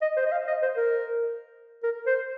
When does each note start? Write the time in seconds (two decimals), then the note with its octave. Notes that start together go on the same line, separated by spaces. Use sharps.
0.01 D#5
0.17 C5
0.26 D#5
0.32 F5
0.47 D#5
0.62 C5
0.76 A#4
1.83 A#4
2.06 C5